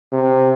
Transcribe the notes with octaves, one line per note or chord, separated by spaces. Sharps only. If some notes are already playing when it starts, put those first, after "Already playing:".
C3